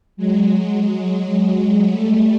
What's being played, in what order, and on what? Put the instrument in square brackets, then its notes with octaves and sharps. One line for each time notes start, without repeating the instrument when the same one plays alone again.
[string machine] F#3 G#3
F#3 G#3
G3 A3